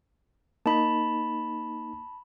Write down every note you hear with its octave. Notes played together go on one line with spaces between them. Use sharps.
A#3 D#4 A5 B5